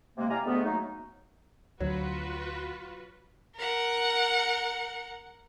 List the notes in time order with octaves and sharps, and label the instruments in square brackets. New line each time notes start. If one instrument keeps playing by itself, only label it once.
[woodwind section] C3 G#3 A#3
E4 G4 D5 F5 G#5 A#5
D2 G#3 A3 B3
C#3 F#3 A3 A#3 D#4
[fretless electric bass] D2 [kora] F#3 [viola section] F4 F#4 B4
[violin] A#4 F#5